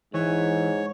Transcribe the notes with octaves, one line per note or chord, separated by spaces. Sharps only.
G#2 E3 C#5